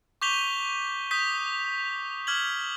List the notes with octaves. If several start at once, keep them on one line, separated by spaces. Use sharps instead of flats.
C#6 D6 G6 B6 F7 G7
D#6 G6 B6
D6 F6 G#6 F#7 G7